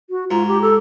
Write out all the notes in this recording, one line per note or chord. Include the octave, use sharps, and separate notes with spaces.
F#4
G#2 F4 A#5
G4
A4